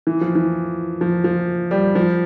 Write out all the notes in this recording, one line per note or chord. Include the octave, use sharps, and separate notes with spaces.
E3
F3
E3
F3
F3
G3
F3